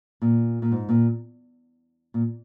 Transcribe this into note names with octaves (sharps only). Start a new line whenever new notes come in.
A#2
A#2
G#2
A#2
A#2